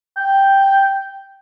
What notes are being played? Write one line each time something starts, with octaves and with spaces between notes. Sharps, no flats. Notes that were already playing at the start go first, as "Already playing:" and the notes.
G5